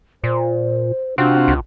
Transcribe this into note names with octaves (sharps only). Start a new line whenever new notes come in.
A#2 C5
C3 C4 D4 F4 F#4
C#2